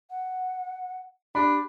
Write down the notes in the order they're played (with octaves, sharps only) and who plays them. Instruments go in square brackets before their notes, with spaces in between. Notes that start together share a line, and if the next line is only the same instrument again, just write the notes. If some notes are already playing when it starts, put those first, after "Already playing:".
[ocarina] F#5
[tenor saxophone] D4 [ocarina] G4 [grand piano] B5